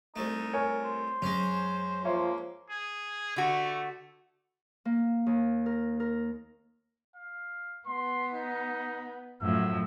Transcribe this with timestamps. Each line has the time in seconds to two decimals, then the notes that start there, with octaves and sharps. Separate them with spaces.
0.16 C2 A3 D#4
0.53 A#4 C#5 G#5
0.85 C5
1.22 F#2 G#3 C#4
2.05 F3 A#3 C#5 E5 C6
2.70 G#4
3.36 D3 A3 F#4
4.85 A#3
5.26 D#2
5.66 A#4
6.00 A#4
7.16 F5
7.87 B3 C6
8.34 D#4
9.42 F#2 A2 F3 E6